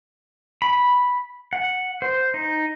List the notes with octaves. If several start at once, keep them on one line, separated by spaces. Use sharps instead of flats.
B5
F#5
C5
D#4